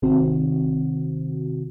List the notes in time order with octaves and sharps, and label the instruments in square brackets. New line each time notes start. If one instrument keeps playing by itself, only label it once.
[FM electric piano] G#1 C3 D#3 C4 F#4